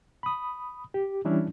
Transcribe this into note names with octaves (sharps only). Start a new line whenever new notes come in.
B5 D#6
G4
E3 G3 C#4 D4 E4